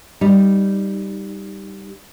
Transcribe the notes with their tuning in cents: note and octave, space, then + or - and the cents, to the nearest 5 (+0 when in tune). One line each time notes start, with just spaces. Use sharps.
G3 +0 D#4 +0